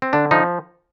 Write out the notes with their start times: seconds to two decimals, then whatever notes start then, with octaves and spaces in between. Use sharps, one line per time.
0.02 C4
0.13 D3 D4
0.31 F3 D#4